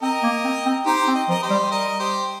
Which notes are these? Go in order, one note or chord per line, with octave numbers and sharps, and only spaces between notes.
C4 A#4 D#5
A#3
C4
C4
D#4 G4 C5
C4
D#5
F3 A#4 D#5
G4 C5
G3
G3 A#4 D#5
G4 C5